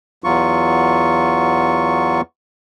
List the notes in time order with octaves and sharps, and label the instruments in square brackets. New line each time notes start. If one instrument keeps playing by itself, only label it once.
[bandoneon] E2 F#3 F4 C#6